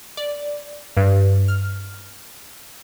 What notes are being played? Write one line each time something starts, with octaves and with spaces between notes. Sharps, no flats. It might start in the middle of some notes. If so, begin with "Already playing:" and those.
D5
G2
F6